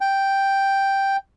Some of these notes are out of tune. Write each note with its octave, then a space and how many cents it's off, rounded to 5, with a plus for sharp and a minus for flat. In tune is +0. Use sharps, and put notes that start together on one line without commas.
G5 +0